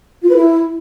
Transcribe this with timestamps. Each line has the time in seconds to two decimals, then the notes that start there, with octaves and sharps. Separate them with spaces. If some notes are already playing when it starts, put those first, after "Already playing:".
0.23 F4
0.29 B4
0.35 E4